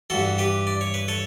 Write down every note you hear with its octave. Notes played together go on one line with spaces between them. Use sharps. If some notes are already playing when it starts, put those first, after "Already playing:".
G2 E3 F#4 A4
G4 B4
D5
C#5
B4
A4 C#5